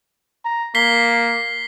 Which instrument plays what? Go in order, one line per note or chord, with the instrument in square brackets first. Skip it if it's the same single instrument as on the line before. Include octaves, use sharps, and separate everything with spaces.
[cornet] A#5
[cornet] A#3 [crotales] B6 C7 G7